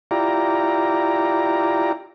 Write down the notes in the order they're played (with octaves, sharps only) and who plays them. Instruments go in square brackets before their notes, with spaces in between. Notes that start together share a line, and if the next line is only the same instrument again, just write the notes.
[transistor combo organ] E4 F4 G4 D5 A#5